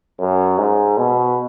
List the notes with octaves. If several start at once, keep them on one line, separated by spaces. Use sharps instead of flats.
F#2
G#2
B2